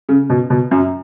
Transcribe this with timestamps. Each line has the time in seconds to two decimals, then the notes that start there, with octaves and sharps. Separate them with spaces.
0.09 C#3
0.30 B2
0.50 B2
0.71 F#2